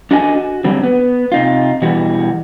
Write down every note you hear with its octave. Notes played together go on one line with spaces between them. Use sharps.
D4 F#4 A4 D#5 G#5
F#4
D3 F#3 G3 C4
B3
C3 D#4 F4
B2 E3 G3 F#4